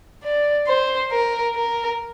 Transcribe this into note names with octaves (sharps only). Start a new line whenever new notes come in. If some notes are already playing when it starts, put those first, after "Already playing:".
D5
C5
A#4
A#4